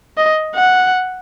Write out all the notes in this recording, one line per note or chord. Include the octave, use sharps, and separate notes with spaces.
D#5
F#5